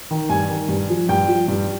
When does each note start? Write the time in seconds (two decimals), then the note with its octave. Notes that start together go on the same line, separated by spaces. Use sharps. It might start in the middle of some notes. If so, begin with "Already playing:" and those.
0.11 D#3
0.29 G2 G#5
0.49 D#3
0.69 G2
0.89 F3
1.09 G2 G5
1.28 F3
1.48 G2